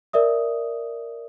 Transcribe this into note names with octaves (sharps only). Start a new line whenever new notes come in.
A#4 D5 E5 D#6